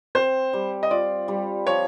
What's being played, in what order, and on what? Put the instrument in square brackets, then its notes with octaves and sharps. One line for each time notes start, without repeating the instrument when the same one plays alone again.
[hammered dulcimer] C4 [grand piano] C5
[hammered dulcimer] G3
[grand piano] D#5
[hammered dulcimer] F4 [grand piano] D5
[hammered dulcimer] G3
[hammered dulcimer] F3 [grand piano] C#5